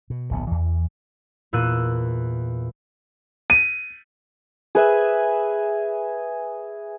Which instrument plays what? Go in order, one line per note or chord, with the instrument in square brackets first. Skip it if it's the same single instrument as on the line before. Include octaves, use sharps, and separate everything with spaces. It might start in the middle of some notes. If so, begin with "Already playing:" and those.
[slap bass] B2
D1 A#1 B3
E2 E3
[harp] E2 A#2 E6 F#6 D#7
[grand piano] D#7
[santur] G#4 B4 E5